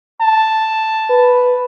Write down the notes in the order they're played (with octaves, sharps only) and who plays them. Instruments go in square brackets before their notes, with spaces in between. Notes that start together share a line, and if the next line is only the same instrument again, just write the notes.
[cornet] A5
[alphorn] B4